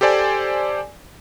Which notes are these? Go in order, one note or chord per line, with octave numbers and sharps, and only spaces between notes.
G4 A4 C5 D5 G#5